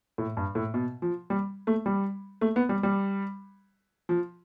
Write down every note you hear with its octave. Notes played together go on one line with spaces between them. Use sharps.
A2
G2
A2
B2
F3
G3
A3
G3
A3
B3
G3
G3
F3